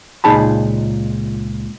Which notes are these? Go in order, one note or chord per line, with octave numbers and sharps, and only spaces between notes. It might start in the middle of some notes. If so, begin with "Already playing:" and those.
C#2 A#2 D#4 G#4 A5 B5